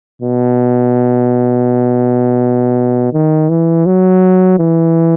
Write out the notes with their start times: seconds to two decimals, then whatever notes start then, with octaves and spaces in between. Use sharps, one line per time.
0.22 B2
3.13 D#3
3.49 E3
3.86 F#3
4.59 E3